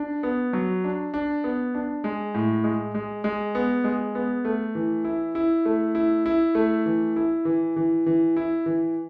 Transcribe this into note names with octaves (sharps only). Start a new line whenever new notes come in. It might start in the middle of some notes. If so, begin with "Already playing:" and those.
Already playing: D4
B3
F#3
D4
D4
B3
D4
G#3
A2
G#3
G#3
G#3
B3
G#3
B3
A3
E3
E4
E4
A3
E4
E4
A3
E3
E4
E3
E3
E3
E4
E3